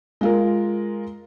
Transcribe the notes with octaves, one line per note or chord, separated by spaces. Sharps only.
G#3 F4 A#4